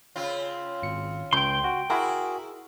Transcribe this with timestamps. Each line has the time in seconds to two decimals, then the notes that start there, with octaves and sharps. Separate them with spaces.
0.16 C#3 C4 F4
0.83 G#1 C#7
1.33 C#2 G5 C6 G6
1.64 F#4
1.90 E4 F#4 G#4 A#4